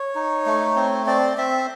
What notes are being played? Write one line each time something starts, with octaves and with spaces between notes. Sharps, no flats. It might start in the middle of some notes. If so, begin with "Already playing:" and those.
Already playing: C#5
D#4
A3
C4
C4 D5
C4 E5